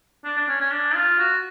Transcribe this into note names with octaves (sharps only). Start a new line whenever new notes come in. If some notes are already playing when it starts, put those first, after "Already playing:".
D4
D4
C#4
C#4
D4
F4
F#4